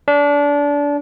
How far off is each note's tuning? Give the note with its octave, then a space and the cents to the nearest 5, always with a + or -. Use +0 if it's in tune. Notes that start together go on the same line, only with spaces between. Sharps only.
D4 -25